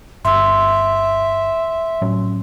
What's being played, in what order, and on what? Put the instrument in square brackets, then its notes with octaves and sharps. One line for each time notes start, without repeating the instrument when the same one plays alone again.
[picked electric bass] G1 [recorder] E5 [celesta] C6 E6
[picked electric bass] A2 F#3 C#4